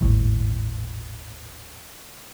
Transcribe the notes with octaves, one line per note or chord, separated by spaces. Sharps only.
D#1 G#1 A2